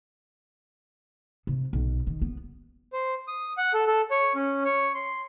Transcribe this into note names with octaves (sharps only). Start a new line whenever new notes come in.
C3
B1
D#3
B3
C5
D#6
F#5
A4
A4
C#5
C#4
C#5
C6